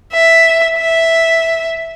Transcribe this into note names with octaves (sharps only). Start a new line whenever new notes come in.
E5
E5